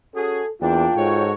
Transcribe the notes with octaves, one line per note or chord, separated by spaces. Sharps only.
C#4 F#4 G#4 A4
E2 A#3 D4 F4 G5
G#2 F#4 A4 C#5